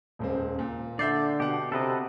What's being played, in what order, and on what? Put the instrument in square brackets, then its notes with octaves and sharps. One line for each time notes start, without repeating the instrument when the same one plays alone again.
[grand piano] D#1 C#2 C4
A#2
[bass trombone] D3 [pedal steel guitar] D5 [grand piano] E5 G6 C7
[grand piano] B2 F#5 [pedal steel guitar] G4
[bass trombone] C3 [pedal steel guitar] A4 B4 D#5